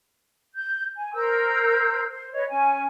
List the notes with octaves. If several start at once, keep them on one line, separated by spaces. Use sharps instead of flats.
G6
G#5
A#4 C5 E6 G6
C5
B4 C#5 D#5
C#4 G#5